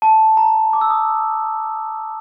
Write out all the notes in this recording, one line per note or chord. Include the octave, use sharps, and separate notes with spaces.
A5
A#5
D6
E6
D#6